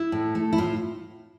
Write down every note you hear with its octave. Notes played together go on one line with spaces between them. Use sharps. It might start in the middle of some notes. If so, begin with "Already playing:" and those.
Already playing: E4
A2
A3
E4
A2 F4